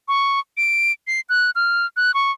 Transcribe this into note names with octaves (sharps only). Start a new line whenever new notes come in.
C#6
D7
C7
F#6
F6
F#6
C#6